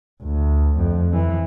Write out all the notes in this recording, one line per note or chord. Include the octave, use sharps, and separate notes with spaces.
D2
F2
E3